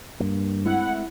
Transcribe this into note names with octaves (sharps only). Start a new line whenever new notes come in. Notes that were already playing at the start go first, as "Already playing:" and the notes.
G2 A#3
G#3 A3 C4 E4 F#5